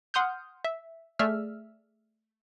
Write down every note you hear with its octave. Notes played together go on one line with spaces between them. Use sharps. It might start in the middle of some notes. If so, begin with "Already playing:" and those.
F#5 C6 D#6 F6 G6
E5
A3 G#4 D5 E5 E6 F6